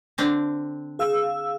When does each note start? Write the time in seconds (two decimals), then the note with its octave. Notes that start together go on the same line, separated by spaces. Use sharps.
0.18 D3 C4 D4
0.99 G#4 F5 E6